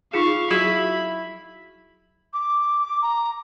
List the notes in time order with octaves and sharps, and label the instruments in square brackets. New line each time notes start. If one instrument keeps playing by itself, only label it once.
[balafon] D#4 F4 G#4 [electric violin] F5 C#6
[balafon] F#3 F#4 G#4 [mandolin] E4 [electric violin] B5
[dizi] D6
A#5